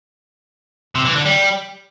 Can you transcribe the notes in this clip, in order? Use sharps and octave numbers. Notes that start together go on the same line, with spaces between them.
C3
E3
D3
G3